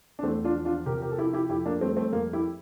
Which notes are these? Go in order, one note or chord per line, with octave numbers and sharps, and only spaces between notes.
D4
E2 A3 C4
D4 F4
F3
D4 F4
C3 G4 A#4
G4 A#4
A4
F3 E4 G4
E4 G4
F2 E4 G4
A#3 D4
G3 A3 C4
A3 C4
F2 A#3
E4 G4